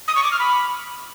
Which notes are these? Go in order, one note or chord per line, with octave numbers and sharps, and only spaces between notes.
D#6
C#6
D6
F6
B5